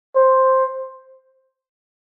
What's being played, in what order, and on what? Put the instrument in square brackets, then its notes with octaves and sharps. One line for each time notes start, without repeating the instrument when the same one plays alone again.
[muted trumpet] C5